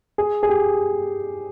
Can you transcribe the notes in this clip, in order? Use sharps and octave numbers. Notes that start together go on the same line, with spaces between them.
G#4
G#4
G4